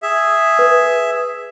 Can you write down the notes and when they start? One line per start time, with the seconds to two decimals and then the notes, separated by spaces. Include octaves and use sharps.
0.02 G#4 E5
0.59 B4